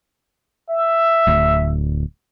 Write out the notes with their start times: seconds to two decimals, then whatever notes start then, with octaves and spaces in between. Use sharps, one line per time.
0.69 E5
1.27 D1 D2